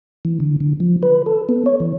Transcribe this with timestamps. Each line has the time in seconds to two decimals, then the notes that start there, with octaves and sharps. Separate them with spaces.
0.25 E3
0.40 D3
0.60 D3
0.80 F3
1.03 B4
1.26 A4
1.49 B3
1.66 C#5
1.80 E3